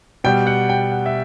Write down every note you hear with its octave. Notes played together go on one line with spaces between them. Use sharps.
B2 G3 G5
F#5
G5
F#5
E5